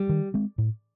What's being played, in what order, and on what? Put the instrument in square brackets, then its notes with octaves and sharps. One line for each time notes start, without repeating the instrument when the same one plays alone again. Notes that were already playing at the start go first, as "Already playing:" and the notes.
Already playing: [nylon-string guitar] G3
[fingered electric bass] D#3
G#3 C4
A2